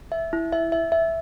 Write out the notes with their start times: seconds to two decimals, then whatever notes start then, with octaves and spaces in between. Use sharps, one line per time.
0.12 E5
0.33 E4
0.53 E5
0.72 E5
0.92 E5